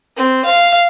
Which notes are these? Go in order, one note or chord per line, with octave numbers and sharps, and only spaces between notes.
C4
F5